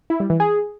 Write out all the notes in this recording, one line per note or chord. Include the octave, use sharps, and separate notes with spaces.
E4
G3
E3
G#4